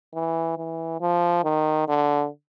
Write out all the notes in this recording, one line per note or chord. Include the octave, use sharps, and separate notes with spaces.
E3
E3
F3
D#3
D3